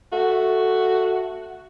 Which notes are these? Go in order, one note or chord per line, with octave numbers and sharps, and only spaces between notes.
A3 F#4